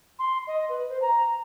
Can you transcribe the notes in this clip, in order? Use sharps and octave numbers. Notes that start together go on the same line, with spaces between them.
C6
D#5
B4
C5
A#5